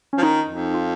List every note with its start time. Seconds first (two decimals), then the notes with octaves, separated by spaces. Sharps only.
0.13 F3 C#4
0.23 D#3 D#4
0.48 F2
0.74 F4